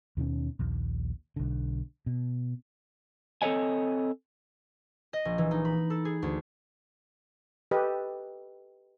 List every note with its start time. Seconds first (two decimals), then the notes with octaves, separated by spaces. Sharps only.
0.17 D#2 B2 D#3 C#4
0.59 A#1 D#2
1.36 B1 D3
2.06 B2
3.42 C4 A4 B4 C#5 D#5 G#5
5.13 D#5
5.25 A#1
5.38 E3
5.51 D#4
5.65 B5
5.90 A4
6.05 G#4
6.22 D2
7.71 G4 A4 B4 D#5